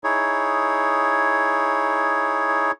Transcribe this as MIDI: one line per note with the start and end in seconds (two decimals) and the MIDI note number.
0.04 2.71 63
0.04 2.71 64
0.04 2.71 68
0.04 2.71 73